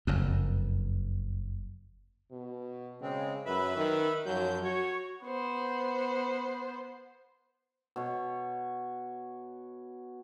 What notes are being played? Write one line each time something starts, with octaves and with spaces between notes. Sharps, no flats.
F#1 F2
B2
C#3 G#3 C4
F#2 B4 E5 B5
D#3
F#2 F3 F#3 G6
F#4 C#5
B3 C5
B2 C#5